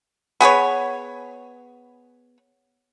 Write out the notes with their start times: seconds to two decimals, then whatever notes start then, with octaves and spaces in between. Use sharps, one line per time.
0.41 B3 G#4 B4 C#5